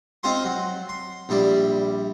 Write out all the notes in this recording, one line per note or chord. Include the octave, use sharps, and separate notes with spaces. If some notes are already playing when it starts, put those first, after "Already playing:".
C4 D#4 F4 C5 C6
F#3
C6
A#1 G3 E4 D5